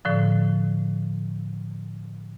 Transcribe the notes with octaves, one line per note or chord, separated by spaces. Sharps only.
A2 D3 F3